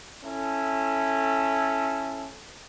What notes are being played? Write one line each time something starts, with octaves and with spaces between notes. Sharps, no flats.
C#4 E4 A4